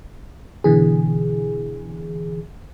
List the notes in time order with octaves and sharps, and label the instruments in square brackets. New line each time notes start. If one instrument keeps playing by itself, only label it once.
[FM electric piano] B2 D3 E3 G#4